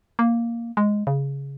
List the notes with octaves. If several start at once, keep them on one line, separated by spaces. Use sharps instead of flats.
A#3
G#3
C#3